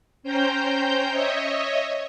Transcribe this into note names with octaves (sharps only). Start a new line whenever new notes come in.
C#4 C5 G5 A#5 G6
C#5 D#5 E5